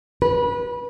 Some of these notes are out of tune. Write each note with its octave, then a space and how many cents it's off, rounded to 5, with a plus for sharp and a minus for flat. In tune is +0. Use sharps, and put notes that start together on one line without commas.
B4 -25